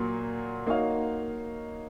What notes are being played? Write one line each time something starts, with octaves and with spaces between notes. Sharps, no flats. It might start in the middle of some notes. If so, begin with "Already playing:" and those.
Already playing: A#2 F#3 A#3
A#3 D#4 F#4 C#5 F5